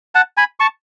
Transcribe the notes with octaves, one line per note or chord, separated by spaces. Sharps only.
F#5 A5
G#5 B5
A5 C#6